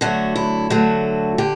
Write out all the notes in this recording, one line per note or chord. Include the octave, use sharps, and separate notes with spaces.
D3 F#3 A3 F#4
E4
D3 F#3 A3 F#4
D3 G4